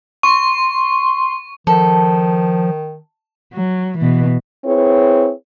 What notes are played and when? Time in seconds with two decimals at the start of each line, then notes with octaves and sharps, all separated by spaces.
0.23 C6 C#6
1.67 D#3 F3 A4
3.53 F#3
3.98 B2 E3
4.65 C4 E4 G#4 B4 C#5